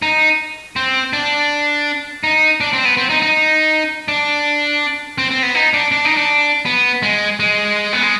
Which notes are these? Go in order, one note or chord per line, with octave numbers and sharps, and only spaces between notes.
D#4
C4
D4
D#4
D4
C4
B3
C4
D#4
D#4
D4
C4
C4
B3
D#4
D4
D4
D#4
D4
B3
G#3
G#3
B3
G#3